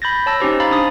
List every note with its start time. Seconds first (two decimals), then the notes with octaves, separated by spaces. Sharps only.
0.02 B5 G6 A6 A#6
0.26 C#5 A5 E6 A#6
0.40 C#4 D#4 G4 C5
0.60 F5 A#5 B5 A6
0.71 D4 C5 D#6